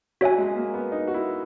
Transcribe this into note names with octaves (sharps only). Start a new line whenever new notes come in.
F#3 F#4 C#5 E5 G#5
G#3
A#3
B3
D#4
F#4
E4